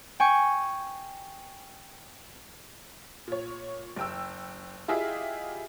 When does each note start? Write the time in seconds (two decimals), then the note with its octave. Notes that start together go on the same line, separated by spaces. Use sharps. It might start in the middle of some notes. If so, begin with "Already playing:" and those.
0.20 G5 G#5 C#6
3.28 A#2 C#5
3.96 F#1 G5 E6
4.88 E4 F4 G4 G#4 D#5 E5